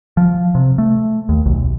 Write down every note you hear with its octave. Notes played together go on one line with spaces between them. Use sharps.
F3
C3
A3
D#2
B1